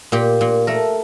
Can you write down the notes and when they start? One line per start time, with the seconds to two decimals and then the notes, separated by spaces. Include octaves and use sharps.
0.12 A#2 G4
0.41 A#2
0.67 A3 A#4